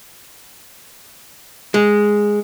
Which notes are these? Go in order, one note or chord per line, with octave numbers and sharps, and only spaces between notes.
G#3